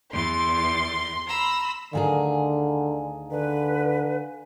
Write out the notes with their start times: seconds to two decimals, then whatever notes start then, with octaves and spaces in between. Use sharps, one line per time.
0.13 E2 C6 A6
1.27 A#5 B5 E6
1.93 D2 D3 D#3 G#4 F5 G#5 A#5
3.31 D3 B4